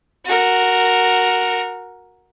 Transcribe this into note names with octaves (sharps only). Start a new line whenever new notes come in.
F#4 A#4